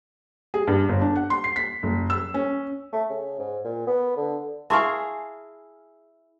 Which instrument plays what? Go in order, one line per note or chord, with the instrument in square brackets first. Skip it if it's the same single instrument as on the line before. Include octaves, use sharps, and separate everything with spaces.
[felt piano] G#4
G2
G1
D4
F#5
C6
C7
B6
F#1
E6
C#4
[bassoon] A3
C#3
G#2
A#2
B3
D3
[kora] E4 G#4 F5 [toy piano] E5 G#5 [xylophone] A5 C6 C#6